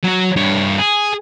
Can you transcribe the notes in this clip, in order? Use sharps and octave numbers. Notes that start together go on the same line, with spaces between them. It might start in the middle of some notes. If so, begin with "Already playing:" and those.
F#3 F#4
G2 C#5
G#4